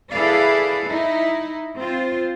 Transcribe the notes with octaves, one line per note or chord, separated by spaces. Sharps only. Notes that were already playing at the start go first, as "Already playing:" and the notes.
E4 G#4 A4 B4 D5 F5
D#4 E4
C4 F4 C5